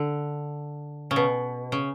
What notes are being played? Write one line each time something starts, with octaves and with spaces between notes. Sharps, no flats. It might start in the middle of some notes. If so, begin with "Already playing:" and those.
Already playing: D3
C#3
B2
C#3